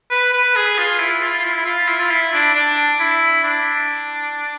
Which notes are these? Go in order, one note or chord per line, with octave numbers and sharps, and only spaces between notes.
B4
B4
G#4
F4
E4
F4
F4
E4
E4
F4
E4
F4
E4
D4
D4
E4
D4